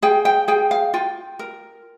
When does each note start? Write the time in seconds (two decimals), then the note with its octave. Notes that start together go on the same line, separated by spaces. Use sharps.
0.02 G#4 G5
0.25 G5
0.48 G#4 G5
0.71 F5
0.94 F4 G5
1.39 A#4